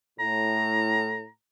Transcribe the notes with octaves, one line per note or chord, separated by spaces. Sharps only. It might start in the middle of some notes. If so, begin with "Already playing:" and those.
A2 A#5